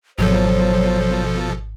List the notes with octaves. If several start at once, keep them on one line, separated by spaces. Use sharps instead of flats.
G#1 B2 F3 F#3 A4 C5